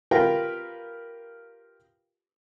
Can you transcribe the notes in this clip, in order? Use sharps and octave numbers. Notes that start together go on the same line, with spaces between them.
F4 G4 A#4 B4 F5 G5